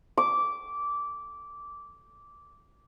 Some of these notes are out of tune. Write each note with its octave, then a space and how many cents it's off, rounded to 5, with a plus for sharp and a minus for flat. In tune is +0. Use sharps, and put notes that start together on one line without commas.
D6 -15